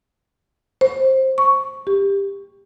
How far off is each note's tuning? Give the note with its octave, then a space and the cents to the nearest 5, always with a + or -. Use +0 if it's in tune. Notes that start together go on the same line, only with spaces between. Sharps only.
C5 +15
C#6 +0
G4 +20